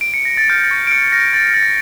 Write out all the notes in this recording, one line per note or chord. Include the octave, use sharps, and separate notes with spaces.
D7
C#7
A#6
A6
F6 G6
A6
C#6
D7
F6 C#7
C#7
F6 A#6
C#6 A6
F6 A6
A#6